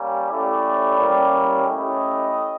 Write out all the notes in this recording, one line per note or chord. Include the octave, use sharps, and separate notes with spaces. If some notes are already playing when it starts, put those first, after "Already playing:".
Already playing: G3 A#3 C#4
A3 C#4 E4 G4 D5
G3 A#3 C#4 E4 G4
A3 C#4 E4 G4 D#5